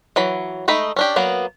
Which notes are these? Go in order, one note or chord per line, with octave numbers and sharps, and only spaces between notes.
E3 F#3 B5
G#3 A3 D#4 B5
C#4 D4 G4
F#3 A#3 B3